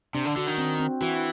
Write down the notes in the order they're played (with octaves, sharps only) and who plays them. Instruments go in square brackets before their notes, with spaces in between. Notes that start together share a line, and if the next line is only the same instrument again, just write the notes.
[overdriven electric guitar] C3 [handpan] D4
[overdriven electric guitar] D3
[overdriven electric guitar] D3 [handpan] F#4
[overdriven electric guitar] D#3
[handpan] C4
C4
[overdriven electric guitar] E3 [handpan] F#4